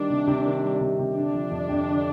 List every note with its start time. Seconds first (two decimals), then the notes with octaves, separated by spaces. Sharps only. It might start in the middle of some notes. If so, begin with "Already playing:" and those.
Already playing: D#3 G3 D4
0.10 C3
0.27 C3
0.46 D#3
0.64 G3
0.81 C3
0.99 C3
1.16 D3 D4
1.33 F3
1.51 F2
1.69 F2
1.87 D3